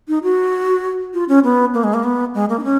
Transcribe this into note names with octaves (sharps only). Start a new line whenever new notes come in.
D#4
F#4
F4
C#4
B3
A#3
G#3
A#3
B3
G#3
A#3
D#4
C#4